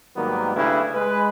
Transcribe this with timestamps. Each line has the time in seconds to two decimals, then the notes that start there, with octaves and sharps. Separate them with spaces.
0.16 G#2 D#3 F#3 G3 A#3 B3
0.55 C#3 A3 D4 E4 G4 B4
0.94 G#3 B4